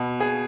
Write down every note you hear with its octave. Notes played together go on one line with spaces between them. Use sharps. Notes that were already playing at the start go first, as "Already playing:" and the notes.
Already playing: B2
G#4